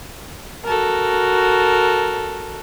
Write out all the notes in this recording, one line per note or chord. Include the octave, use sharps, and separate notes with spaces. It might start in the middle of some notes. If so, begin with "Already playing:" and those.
F#4 A4 A#4